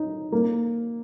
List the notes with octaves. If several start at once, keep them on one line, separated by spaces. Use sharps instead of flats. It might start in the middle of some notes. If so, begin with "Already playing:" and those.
Already playing: D#4
A#3